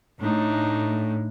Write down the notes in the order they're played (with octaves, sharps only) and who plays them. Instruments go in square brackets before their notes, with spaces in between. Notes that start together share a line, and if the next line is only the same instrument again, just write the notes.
[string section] A2 [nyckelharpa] D4 D#4